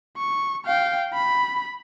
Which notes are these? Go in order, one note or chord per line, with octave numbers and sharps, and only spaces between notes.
C#6
F5 G5
B5